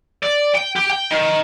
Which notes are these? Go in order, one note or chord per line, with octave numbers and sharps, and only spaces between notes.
D5
G5
G4
G5
D#3